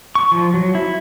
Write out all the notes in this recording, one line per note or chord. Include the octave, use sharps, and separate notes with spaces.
C#6
F3
F#3
E4